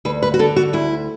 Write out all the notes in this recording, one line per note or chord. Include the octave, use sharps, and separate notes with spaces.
D2 B4
B4
F#4
D3 A4
F#4
D2 E4